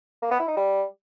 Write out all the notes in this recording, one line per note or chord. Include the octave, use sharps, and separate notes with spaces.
A#3
B3
E4
D#4
G3